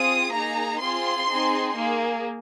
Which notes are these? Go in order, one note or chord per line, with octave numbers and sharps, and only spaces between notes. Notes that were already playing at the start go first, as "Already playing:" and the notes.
Already playing: C4 F4 G#4 D#6
A#3 D#4 G#4 A#5
C4 F4 G#4 C6
C4 D#4 G#4
A#3 G#4